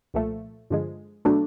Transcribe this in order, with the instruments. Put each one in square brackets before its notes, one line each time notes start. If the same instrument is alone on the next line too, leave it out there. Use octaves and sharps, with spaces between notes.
[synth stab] C2 A#2 F3 A3
G2 D3 F3 G#3
B2 F#3 A3 D4